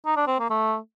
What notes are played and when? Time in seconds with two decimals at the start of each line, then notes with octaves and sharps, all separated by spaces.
0.06 D#4
0.17 D4
0.27 C4
0.39 A#3
0.50 A3